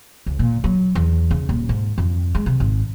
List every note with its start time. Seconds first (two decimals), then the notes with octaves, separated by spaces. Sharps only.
0.26 C#2
0.39 A#2
0.64 F#3
0.95 E2
1.31 C#3
1.49 D#1
1.69 G#2
1.98 F2
2.35 G#3
2.46 C3
2.60 G#1